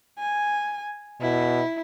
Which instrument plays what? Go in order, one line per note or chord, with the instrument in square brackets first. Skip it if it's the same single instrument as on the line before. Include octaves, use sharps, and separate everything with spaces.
[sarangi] G#5
[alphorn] B2 [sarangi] E4